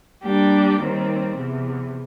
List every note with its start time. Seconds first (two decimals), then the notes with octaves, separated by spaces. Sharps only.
0.23 G3 A#3 D4 G4
0.80 D#2 D#3 G3 C4
1.36 E2 C3 E3